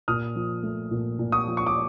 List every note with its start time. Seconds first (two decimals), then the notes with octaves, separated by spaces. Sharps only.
0.08 A#2 D#6 F6
0.35 F3
0.63 A3
0.91 A#2
1.19 A#2
1.32 C#6 D#6
1.47 F3
1.57 C#6
1.67 D6